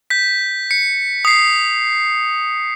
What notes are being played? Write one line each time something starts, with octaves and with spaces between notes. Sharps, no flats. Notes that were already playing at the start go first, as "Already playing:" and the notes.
G6 B6
C#7
D#6 C7